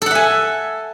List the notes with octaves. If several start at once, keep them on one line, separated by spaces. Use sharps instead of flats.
A4 E5 F#5 G#5